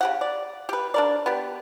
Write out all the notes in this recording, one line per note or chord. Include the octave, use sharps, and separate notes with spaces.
C#3 G4 F#5
D5
G4 B4
D4 A#4 D5
B3 G4